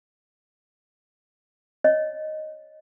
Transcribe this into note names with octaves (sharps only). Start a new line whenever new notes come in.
C#5 D#5